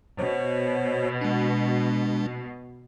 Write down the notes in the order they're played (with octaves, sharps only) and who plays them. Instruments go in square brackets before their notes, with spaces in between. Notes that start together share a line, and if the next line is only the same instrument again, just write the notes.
[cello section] B2 [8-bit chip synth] C5 C#5
[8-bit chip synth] G#3 D4